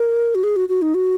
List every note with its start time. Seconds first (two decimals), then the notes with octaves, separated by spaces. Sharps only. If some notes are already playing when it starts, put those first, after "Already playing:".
Already playing: A#4
0.35 F#4
0.44 G#4
0.56 F#4
0.69 F#4
0.82 D#4
0.95 F#4